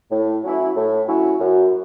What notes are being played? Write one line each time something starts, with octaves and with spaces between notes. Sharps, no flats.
A2
F#3 C#4 E4
A2
F#3 C#4 E4
F#2